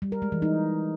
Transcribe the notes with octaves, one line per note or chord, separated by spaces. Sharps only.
G3
A#4
G#3
E3
D#4